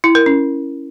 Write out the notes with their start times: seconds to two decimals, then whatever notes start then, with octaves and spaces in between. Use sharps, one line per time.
0.04 E4
0.15 A#4
0.26 C#4